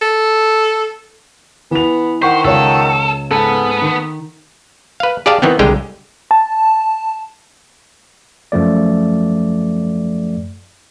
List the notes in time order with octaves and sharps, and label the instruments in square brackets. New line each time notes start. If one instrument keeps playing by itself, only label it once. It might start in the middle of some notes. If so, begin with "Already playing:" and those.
[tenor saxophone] A4
[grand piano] E3 F7 [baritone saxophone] B3
[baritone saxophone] D#3 [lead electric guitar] C5 [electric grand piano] F#5 C#6 B6
[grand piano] C#2 F4 C#5 [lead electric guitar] A4
[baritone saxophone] G#2 [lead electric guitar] B3 B4 [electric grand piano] A4
[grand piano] D#3
[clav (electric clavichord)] B4 F5
G4 G#4 D5 F5 A5
D#3 E3 B3 C4
C2 D3 G#3 G4 G#4 G5
[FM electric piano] A5
[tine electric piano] F#2 F3 A3 D5